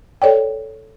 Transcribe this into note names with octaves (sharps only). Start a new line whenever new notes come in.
A4 C#5 D5 G5